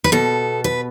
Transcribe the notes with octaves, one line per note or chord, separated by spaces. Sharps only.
B4
B2 A4
B4